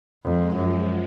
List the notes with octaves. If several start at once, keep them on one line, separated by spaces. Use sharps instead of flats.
F2 F3 G#3
F#2